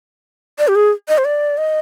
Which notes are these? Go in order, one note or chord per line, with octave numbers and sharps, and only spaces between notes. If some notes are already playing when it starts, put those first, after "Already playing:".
D5
G4
G#4
D#5
C5
D5
D#5